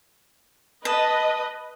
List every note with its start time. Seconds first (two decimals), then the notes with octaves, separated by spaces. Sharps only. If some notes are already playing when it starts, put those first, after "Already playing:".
0.85 B4 D#5 A5